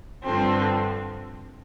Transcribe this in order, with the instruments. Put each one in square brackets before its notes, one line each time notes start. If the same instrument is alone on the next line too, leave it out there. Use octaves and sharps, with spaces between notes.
[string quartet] G2 D3 F3 C4